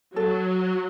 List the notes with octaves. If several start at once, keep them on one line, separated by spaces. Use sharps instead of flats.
F#3 A4